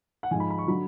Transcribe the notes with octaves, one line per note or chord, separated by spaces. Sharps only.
F#5
G#2 F3 G#5
B5
B5
C#6
D3 F#3 B5